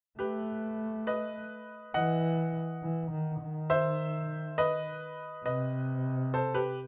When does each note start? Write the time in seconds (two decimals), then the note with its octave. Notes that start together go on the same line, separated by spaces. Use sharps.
0.19 A3 G4 B4
1.07 B4 D#5
1.94 E3 D#5 F#5
2.83 E3
3.11 D#3
3.41 D#3
3.70 C5 E5
4.58 B4 D#5
5.45 C3 B4 D#5
6.34 A4 C5
6.54 G4 B4